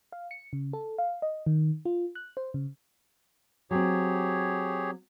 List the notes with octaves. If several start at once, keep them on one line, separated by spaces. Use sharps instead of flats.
F5
C#7
C#3
A4
F5
D#5
D#3
F4
F#6
C5
C#3
F#3 C4 G4 G#4 C#5